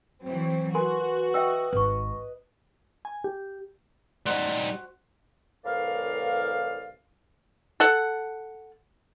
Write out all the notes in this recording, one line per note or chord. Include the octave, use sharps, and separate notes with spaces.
E3 F#3 C4
F#4 A#4 B4 G#5 C6
D#5 E5 G5 E6
G#1 B4 C#6
G#5
G4
G3 D#4 F#4 C5 E6
C2 A2 E3 A#4 D5 F5
A4 F#5